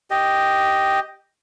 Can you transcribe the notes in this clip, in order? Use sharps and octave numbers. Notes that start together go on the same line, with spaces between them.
G4 D#5